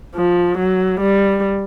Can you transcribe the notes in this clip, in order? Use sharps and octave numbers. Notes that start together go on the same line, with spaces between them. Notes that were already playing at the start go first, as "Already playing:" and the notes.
F3
F#3
G3